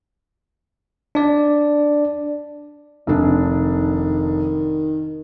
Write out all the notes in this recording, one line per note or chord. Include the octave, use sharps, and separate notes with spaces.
D4 D5
F1 D#3 D4